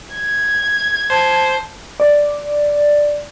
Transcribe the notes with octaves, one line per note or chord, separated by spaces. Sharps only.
G#6
C5 A5
D5